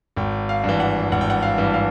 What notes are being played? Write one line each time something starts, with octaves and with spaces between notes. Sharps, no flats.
G#1 G5
F5
G2
E3
F#5
G#1 F#5
G5
F#5
F5
G2 E3
F5